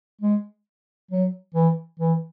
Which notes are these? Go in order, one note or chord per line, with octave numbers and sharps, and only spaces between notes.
G#3
F#3
E3
E3